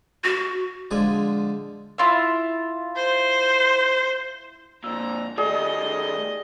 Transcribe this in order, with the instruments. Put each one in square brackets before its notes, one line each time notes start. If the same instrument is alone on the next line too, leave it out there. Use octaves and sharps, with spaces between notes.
[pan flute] F#4
[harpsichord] D3 F3 G#3 G#5
[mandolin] E4 F4 E5
[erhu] C5
[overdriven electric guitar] F2 A#2 [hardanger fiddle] A#5 [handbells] E6
[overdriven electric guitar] D#3 A3 [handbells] G4 D5 [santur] G#4 [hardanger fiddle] D#5